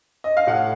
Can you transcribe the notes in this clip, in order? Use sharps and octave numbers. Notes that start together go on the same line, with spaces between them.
D#5
F5
A2 F#5